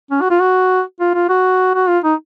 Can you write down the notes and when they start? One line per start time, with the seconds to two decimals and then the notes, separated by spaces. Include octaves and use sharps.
0.11 C#4
0.21 F#4
0.30 F4
0.40 F#4
1.00 F4
1.15 F4
1.29 F#4
1.75 F#4
1.89 F4
2.04 D#4